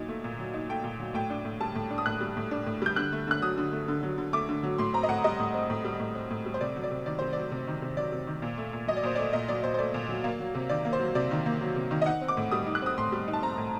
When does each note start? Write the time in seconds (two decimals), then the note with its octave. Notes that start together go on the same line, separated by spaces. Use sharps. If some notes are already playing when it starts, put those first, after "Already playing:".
Already playing: A#2 F#3 D#4
0.08 A3
0.24 A#2
0.39 F#3
0.54 D#4
0.69 A3 G5
0.84 A#2
1.00 F#3
1.14 A2 G5
1.30 D4
1.45 A2
1.61 G3 A5
1.75 A2
1.91 D4
1.98 D#6
2.06 A2 F#6
2.21 G3
2.37 A2
2.51 D4
2.66 A2
2.82 G3 G6
2.96 D3 F#6
3.12 A3
3.27 D3 F#6
3.42 F#3 D#6
3.57 D3
3.72 A3
3.88 D3
4.03 F#3
4.18 D3
4.33 A3 D6
4.49 D3
4.63 F#3
4.78 A2 C6
4.93 C4 A#5
5.03 D#5
5.09 A2 F#5
5.24 G3 D#5
5.39 A2
5.54 C4
5.70 A2
5.85 G3
6.00 A2
6.15 C4
6.30 A2
6.46 G3
6.54 C5
6.61 C3 D5
6.76 F#3
6.83 D5
6.91 C3
7.06 D#3 D5
7.19 C3 C5
7.33 F#3 D5
7.51 C3
7.67 D#3
7.82 C3
7.97 F#3 D5
8.12 C3
8.27 D#3
8.42 A#2
8.58 A3
8.73 A#2
8.88 F#3 D#5
8.96 D5
9.03 A#2 C5
9.16 A3 D5
9.33 A#2 D#5
9.48 F#3 D5
9.63 A#2 C5
9.74 C5
9.79 A3 D5
9.94 A#2
10.09 F#3
10.24 A#3
10.40 F#3
10.55 C3
10.69 D#3 D5
10.85 A#3
10.93 C5
11.00 F#3
11.15 C3 D5
11.31 D#3
11.46 A#3
11.61 F#3
11.76 C3
11.91 D#3
12.02 D#5
12.06 D#4 F#5
12.21 C4
12.28 D6
12.37 A2
12.51 G3 D#6
12.67 D#4
12.75 F#6
12.82 C4 D#6
12.98 A2 C6
13.12 G3
13.28 D#4
13.33 A5
13.42 C4 A#5
13.57 A2